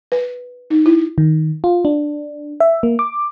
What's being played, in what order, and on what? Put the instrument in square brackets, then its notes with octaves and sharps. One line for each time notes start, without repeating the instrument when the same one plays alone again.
[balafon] B4
D#4
E4
[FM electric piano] D#3
F4
D4
E5
A#3
D6